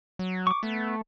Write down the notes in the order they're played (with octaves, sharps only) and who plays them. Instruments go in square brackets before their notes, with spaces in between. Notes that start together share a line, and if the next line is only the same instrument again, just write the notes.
[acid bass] F#3
[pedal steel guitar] C#6 D6
[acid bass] A3 [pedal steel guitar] B3